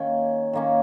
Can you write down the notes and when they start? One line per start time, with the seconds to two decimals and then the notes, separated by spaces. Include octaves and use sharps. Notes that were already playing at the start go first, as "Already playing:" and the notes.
Already playing: D#3 A#3 C#4
0.53 D#3 A#3 C#4